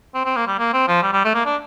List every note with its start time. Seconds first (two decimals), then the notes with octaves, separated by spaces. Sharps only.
0.15 C4
0.25 C4
0.36 A#3
0.48 G3
0.59 A#3
0.74 C4
0.88 F3
1.02 G3
1.13 G3
1.25 A3
1.35 A#3
1.46 D4